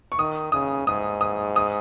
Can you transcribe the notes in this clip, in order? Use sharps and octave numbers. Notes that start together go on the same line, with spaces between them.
C#6
D#3 D#6
C#3 D#6
G#2 D#6
D#6
D#6